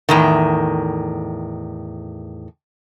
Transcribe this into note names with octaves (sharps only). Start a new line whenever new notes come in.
E2 A2 D#3